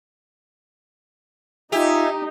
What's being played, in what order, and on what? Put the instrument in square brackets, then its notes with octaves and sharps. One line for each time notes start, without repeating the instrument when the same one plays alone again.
[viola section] D#4 [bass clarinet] F4 [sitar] G4 [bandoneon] E5 G#5